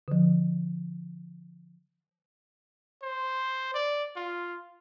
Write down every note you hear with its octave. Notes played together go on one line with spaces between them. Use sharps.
D3 F3
C5
D5
F4